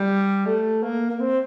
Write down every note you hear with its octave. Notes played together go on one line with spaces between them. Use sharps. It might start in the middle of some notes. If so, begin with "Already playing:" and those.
Already playing: G3
A3
A#3
A#3
C4